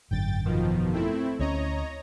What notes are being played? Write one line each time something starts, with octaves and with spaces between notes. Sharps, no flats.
G#1 F#2 D3 G5 A6
B2 D#3 F3
A3 C4 E4
D2 A#3 C#4 C#5 D#5 A#5